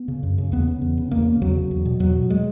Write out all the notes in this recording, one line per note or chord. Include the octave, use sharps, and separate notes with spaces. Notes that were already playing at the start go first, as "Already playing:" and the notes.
Already playing: B3
C#3
F#2
C#3
E2 B3
C#3
E2
C#3
E2 A#3
C#3
E2 F#3
C#3
E2
B2
E2 F#3
B2
G#3